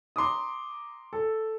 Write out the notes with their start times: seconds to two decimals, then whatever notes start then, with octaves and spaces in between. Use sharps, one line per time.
0.16 A#5 C6 D6 D#6
1.13 A4